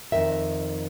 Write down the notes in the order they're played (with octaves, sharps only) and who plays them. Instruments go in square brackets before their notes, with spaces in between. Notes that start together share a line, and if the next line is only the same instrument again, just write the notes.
[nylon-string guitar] F2 G#2 D#3 A#4 E5